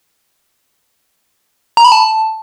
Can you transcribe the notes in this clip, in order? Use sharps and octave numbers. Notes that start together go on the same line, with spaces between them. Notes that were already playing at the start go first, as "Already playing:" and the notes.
A#5
B5
A5